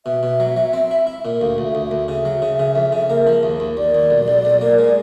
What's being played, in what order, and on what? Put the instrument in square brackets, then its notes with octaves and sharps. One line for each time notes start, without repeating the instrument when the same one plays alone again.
[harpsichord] B2 [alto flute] E5
[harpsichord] B2
F#3
F#3
C4
E4
E4
A#2
[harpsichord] D2 [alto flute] F5
[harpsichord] D2
[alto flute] E5
[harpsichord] D2
[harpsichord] D2 [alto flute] E5
[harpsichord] C#3 [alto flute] E5
[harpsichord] F#3
C#3
C#3
F2
C#3
A#3
F3
D#2
D#2
[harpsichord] D#2 [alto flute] D5
[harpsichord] D#2
B1
B1
B1
A#3
G#3